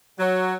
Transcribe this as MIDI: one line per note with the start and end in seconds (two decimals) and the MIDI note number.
0.19 0.54 54